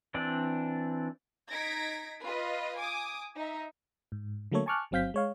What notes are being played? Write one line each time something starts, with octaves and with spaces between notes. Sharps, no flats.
E3 C4 D4 D5
D#4 G#6 A#6 B6 D7
F4 B4 D#5
G#5 D6 D#6
D#4 E5
G#2
D3 F#3 A3 A#3 A4 C#5
G#5 A5 C#6 D6 F6 F#6
G1 F#3 C4 F5 G6 B6
G#3 C#5 F5